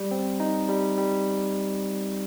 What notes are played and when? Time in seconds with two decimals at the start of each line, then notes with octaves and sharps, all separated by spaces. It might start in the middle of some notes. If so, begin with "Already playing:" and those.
Already playing: G3
0.11 C4
0.40 D#4
0.69 G3
0.98 G3